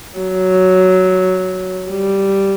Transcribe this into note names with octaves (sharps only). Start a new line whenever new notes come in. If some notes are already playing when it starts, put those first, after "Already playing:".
F#3
G3